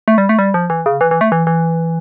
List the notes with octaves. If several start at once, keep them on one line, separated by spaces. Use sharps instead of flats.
A3
G3
A3
G3
F3
E3
C#3
E3
E3
A3
E3
E3